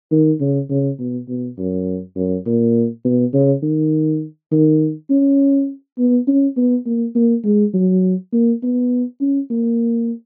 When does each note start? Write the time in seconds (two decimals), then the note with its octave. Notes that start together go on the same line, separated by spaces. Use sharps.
0.11 D#3
0.41 C#3
0.70 C#3
0.99 B2
1.29 B2
1.58 F#2
2.16 F#2
2.46 A#2
3.05 B2
3.33 C#3
3.63 D#3
4.52 D#3
5.10 C#4
5.98 B3
6.27 C#4
6.57 B3
6.86 A#3
7.15 A#3
7.44 G#3
7.74 F#3
8.32 A#3
8.63 B3
9.21 C#4
9.50 A#3